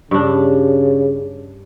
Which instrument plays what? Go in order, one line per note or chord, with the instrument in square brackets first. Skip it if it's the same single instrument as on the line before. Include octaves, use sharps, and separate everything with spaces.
[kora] G2 D4 [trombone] C#3